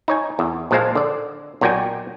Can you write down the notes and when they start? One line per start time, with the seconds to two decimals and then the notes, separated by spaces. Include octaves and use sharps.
0.08 D#4 C#5 G#5
0.39 E2
0.71 A#1 A#2 G#3 C5 F5 A5
0.95 D3 D5
1.61 B1 A#2 F#4 D5 G5 G#5